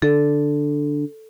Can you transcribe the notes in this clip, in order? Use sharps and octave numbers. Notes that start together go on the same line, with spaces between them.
D3 A4